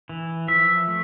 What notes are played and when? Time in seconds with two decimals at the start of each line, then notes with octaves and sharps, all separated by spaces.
0.09 E3
0.48 F3 E5
0.88 A3